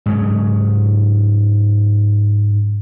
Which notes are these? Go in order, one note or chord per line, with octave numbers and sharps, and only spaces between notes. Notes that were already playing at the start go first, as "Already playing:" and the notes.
G#2 C#3 F#3